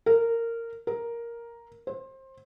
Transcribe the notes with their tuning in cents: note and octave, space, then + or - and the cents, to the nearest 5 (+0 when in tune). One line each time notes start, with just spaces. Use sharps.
A#4 -15
A#4 +5
C5 +20